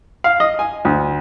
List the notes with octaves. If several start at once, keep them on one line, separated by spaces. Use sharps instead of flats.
F5
D#5
G#5
D2